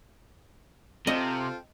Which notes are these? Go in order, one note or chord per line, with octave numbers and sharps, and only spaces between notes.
C3 C4 F4 A4 D#5